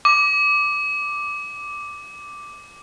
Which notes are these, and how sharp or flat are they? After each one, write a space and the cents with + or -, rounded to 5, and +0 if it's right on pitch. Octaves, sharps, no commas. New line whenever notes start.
D6 +0